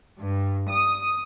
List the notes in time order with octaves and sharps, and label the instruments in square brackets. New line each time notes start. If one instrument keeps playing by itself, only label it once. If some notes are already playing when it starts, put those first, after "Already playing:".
[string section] G2
D#6